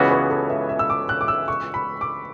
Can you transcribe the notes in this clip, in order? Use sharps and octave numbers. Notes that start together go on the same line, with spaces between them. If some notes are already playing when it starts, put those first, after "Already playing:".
Already playing: C#2 C#3 E3 B3 F#4 B4
C#5
A4
E5
E5
E6
D6
F#6
D6
E6
C#6
B5
D6